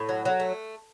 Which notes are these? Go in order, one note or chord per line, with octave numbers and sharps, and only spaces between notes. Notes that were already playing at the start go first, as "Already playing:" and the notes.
Already playing: A2
F#3
F#3
A3